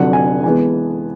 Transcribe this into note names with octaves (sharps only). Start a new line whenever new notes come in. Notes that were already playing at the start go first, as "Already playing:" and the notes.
Already playing: F1 F2 D3 F#3 F#5
G#5
E3 G#3 B3 G#5